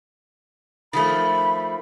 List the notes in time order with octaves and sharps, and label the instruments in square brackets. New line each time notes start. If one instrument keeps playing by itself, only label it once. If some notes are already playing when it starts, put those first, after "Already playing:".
[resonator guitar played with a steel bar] D#3 F3 A3 [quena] B5